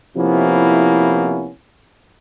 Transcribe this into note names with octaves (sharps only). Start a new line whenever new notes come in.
C3 F3 A#3 B3 C#4 E4